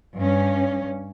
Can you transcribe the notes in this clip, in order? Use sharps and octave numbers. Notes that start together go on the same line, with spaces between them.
G2 C#4